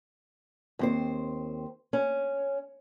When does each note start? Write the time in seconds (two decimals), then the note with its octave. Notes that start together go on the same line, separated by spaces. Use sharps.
0.79 D#2 C4 C5
1.93 C#4